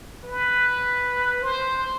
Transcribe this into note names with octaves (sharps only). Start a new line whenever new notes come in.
B4
C5